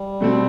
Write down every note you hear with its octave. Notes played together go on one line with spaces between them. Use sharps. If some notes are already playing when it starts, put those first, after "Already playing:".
Already playing: G3
B2 A3 C4